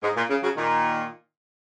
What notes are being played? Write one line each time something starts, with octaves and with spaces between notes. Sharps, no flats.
G#2
A#2
C#3
C#3 F#3
A#2 D#3